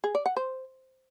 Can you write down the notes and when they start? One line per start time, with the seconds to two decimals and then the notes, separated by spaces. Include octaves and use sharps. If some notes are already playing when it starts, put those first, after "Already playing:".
0.04 G#4
0.15 D5
0.26 F#5
0.37 C5